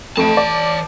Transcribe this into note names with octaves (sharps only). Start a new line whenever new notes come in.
F2 E3 A3 A5 D7
D5